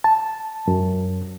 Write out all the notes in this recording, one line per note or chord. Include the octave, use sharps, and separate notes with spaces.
A5
F#2